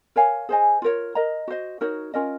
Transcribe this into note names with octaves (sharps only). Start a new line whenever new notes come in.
A#4 C#5 F5 G#5
G#4 C5 D#5 G#5
F4 A#4 C#5
A#4 D#5 A#5
F#4 C5 D#5
D#4 F#4 A#4 C#5
C#4 F4 A#4 D#5